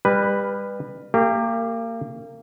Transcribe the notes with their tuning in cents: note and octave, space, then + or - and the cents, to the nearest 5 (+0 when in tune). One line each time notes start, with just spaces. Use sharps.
G3 +30 B4 +0
A#3 -30 G4 +15